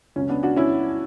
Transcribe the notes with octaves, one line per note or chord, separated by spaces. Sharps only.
C#2 C#3 F#3 C#4
B3 D4
D4 F#4
C#4 E4